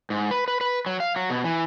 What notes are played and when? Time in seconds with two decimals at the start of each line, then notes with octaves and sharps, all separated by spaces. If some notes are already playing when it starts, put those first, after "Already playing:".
0.10 G#2
0.31 B4
0.48 B4
0.61 B4
0.86 F#3
1.00 F5
1.16 F#3
1.30 B2
1.44 E3